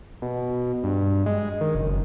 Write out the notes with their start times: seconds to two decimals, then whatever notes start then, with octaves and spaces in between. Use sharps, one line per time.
0.22 B2
0.84 G2
1.26 G#3
1.61 D#3
1.75 F#1